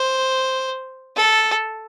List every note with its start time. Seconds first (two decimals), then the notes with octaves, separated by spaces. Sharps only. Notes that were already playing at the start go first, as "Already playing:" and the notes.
Already playing: C5
1.16 A4